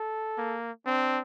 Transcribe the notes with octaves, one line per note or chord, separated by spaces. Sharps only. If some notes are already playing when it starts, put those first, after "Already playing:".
Already playing: A4
A#3
C4 D4